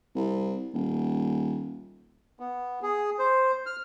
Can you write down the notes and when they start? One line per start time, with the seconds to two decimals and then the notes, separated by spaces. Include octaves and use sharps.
0.15 C2
0.74 D#1
2.40 B3
2.83 G#4
3.19 C5
3.66 F6